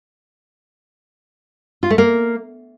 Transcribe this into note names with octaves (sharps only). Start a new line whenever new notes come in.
F4
A3
A#3